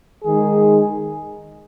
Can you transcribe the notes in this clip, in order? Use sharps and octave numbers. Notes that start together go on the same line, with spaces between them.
D#3 G#3 D#4 G#4